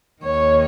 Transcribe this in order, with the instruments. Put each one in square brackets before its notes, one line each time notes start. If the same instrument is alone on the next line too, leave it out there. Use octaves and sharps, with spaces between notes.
[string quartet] D#2 D#3 C#5